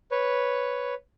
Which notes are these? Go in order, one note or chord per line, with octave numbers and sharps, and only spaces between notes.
B4 C#5